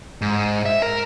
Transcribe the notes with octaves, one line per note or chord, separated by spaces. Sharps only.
G#2
E5
A#4